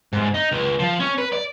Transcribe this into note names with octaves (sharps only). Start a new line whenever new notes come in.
G#2
D#4
C#2
F3
C#4
B4
D5